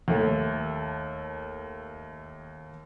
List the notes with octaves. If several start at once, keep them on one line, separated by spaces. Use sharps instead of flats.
D#2 A3 A4